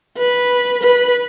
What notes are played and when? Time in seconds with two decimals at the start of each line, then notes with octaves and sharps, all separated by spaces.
0.18 B4
0.82 B4